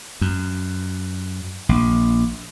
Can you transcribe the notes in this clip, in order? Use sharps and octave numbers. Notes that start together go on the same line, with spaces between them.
F#2
A#1